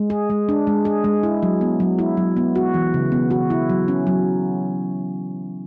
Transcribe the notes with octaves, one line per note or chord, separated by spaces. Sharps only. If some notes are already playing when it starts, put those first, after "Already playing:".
Already playing: G#3
G#4
G#3
D4
G#3
G#4
G#3
E4
F#3
B3
F#3
E4
F#3
B3
F#4
E3
C#3
B3
F#4
E4
F#3
C#4
F#3